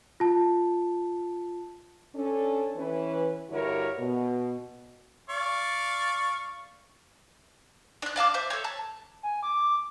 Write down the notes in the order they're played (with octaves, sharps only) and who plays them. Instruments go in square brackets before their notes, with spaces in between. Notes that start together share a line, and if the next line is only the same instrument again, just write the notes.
[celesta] F4 A5
[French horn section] C#4 D4 A4
E3 C#4 B4
G2 D3 E4 F#4 A#4 C#5
B2
[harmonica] D5 F5 C#6
[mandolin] D4 F#6
D5 F5 A5 D6
C5 E5
A4 C#5
A5
[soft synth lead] G#5
D6